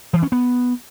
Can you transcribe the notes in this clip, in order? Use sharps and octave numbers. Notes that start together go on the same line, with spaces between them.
E3
C#4
B3